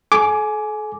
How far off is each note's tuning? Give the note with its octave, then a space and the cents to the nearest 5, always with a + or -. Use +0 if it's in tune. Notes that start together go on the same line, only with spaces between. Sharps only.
A4 -40 G#5 +20 D6 -5